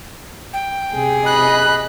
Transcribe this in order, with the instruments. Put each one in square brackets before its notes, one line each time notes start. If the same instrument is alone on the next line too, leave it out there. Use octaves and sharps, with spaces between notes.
[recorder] G5
[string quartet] C3 G#4
[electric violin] D#5 B5 [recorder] F#6